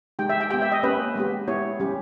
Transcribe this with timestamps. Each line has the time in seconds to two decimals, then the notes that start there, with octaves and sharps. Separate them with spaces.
0.19 G#3 D#4 G4 G5
0.29 E5
0.40 G5
0.51 B3 G4 G5
0.62 E5
0.72 D#5
0.83 A#3 C#4 G4 B4
1.16 G#3 B3 G4
1.48 B3 E4 G4 C#5
1.80 G3 C#4 G4